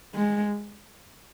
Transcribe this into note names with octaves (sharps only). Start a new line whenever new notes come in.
G#3